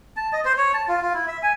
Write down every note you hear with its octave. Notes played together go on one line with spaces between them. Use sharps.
A5
D#5
C5
C#5
A5
F4
F4
E4
E5
G#5